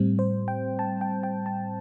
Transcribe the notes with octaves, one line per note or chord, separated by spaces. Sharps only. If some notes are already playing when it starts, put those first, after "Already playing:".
Already playing: A2 G3 C4
C5
G5
A5
G5
G5
A5